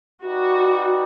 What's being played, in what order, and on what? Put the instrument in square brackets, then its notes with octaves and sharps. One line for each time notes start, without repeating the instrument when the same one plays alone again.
[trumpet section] D#4 G4 B4 D5 [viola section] F#4